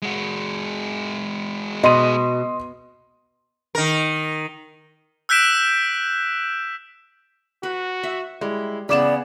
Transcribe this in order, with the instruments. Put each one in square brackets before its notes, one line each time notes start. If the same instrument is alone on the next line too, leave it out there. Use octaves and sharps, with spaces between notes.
[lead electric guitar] G#3 F#4
[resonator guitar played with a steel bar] B2 [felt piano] D#5 C6 D#7
[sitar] D#3 A#4
[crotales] E6 F#6 G6 B6 D7 E7
[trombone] F#4 [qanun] B4
[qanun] E5
[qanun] G3 [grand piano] G#3 [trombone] E4
[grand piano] C#3 D6 E7 [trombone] E3 [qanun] B3 G#4 B5 [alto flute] D5